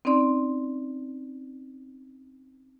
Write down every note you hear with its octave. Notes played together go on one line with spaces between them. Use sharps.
C4 C#4 D#4 D5 C6